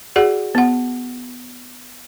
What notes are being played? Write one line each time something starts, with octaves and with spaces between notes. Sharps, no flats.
F#4 G#4 D5 F#5
B3 F#5